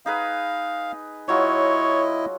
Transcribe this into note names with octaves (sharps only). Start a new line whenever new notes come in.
D#4 G#4 B4 F5
F#3 E4 F4 C#5 D#5